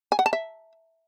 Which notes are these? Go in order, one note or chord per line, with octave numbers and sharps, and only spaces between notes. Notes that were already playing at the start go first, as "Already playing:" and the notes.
G#5
F#5
A5
E5